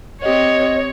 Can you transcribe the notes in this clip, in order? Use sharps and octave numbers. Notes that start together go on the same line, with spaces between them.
C4 G4 C#5 D#5